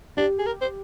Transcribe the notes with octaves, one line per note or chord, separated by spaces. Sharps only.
D4 G4
G#4
A#4
C5